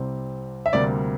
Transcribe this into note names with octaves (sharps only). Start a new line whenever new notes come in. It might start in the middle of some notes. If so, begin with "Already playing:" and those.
Already playing: C2 C3 G3 C4
E5
D2 C3 G3 A#3 D5